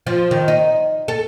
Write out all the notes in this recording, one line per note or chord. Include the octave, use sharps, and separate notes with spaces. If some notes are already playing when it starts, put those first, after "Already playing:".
F3
D#3
D#4
A4